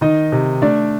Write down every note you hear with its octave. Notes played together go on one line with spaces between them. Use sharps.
D#3 D#4 D#5
C3
A3 D4 D5